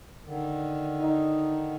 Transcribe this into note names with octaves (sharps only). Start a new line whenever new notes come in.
D3 D#3
D#4